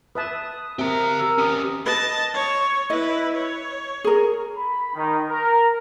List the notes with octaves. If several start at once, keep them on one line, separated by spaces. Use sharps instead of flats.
B4 E5 A5 D#6
C4 G4 A#4 E5 A#5
A#4 E6
C#4 G4 D#6
B4 D#5 A5
C#5
E4 B4 D#5
C#5
G#4 A#4
B5
D#3
A#4